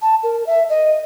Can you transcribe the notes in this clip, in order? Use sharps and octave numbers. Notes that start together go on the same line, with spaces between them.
A5
A#4
E5
D#5